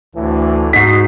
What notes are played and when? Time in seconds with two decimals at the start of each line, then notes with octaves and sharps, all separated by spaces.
0.15 D2 A2 D3 E3
0.73 G#2 D#4 F#4 B6 C7